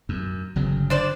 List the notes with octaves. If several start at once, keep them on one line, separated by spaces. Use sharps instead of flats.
F#2
G1 C#3 F#3
D4 C5 D5